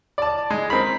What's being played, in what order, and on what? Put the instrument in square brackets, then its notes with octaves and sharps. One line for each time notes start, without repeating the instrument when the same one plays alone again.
[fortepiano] D5 A5
G#3
C4 A#4 B5